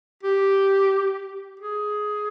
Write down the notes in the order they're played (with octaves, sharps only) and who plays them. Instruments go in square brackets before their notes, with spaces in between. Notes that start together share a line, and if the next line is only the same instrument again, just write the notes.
[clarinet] G4
G#4